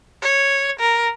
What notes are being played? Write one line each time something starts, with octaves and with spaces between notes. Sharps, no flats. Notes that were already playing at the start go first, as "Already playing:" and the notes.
C#5
A#4